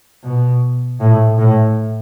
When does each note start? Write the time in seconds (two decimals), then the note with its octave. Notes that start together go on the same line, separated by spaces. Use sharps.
0.23 B2
1.00 A2
1.38 A2